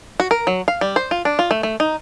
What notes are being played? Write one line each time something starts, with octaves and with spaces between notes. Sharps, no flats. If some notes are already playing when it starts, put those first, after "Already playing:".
F#4
A#4
F#3
F5
G3
C5
F4
D4
F4
A3
A3
D#4